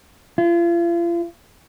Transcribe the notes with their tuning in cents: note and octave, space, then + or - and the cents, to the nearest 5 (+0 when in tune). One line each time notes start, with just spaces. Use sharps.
F4 -40